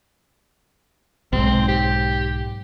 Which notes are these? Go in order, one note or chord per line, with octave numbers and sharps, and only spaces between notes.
B1 G#2 C4
G4